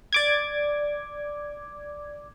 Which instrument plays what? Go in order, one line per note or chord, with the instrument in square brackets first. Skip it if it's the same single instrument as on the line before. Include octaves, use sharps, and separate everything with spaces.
[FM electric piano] D5 D6 G#6